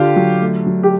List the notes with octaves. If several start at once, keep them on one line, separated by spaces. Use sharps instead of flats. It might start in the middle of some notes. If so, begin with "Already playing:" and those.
Already playing: D3 F4 G4
F#3
A3
F#3
G4